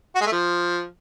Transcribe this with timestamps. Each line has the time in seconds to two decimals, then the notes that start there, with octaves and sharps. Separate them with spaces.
0.15 F#4
0.21 G#3
0.27 A3
0.32 F3